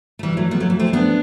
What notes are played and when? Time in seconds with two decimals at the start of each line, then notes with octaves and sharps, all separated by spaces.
0.19 A3
0.23 E3 G3
0.37 F#3 A3
0.51 G3 B3
0.60 F#3 A3
0.70 E3
0.80 A3 C4
0.93 B3 D4